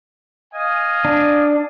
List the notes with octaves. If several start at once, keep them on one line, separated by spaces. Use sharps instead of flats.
D#5 F5 G#5
D4